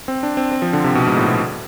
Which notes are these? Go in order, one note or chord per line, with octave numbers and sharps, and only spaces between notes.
C4
D4
C4
C4
F3
D3
C3
B2
G#2
A2
B2